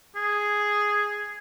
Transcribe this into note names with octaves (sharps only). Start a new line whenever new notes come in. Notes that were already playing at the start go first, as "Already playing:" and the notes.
G#4